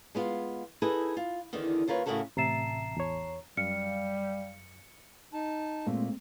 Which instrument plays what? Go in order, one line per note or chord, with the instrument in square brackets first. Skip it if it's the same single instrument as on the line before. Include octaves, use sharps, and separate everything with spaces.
[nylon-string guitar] G#3 B3 F4
D#4 E4 G#4 A4 B4
F4
E2 D3 D#3
D#2 F4 A#4 B4 C#5
A2 C#3 E4 F#4 A4 A#4
[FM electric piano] A1 A5 [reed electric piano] C3 E5 [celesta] A#5 C7 E7
[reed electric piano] E2 C#5
[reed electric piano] F#2 [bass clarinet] G3 [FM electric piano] F5 [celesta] C#7
[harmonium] D#4 A5
[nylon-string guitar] A#2 [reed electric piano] G#3 A3 C4